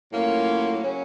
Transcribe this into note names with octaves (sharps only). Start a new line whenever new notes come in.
A2 F#3 A#3 C#4 F4
C#3 F#3 A#3 C#4